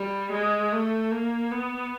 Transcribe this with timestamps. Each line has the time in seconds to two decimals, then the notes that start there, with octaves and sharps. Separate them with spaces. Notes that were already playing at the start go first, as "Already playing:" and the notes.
Already playing: G3
0.33 G#3
0.72 A3
1.12 A#3
1.51 B3